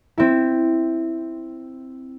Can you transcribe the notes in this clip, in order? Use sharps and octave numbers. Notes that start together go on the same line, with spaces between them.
C4 E4